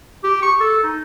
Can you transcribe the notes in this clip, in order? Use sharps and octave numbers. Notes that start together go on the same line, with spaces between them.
G4
C#6
A4
D#4